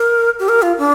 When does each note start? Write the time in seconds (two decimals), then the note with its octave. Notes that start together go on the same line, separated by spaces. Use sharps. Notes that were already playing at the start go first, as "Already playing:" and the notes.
Already playing: A#4
0.39 G4
0.49 A#4
0.62 F4
0.78 D4